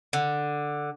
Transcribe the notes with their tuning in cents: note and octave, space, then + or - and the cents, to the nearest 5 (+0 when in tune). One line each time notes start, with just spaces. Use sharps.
D3 +5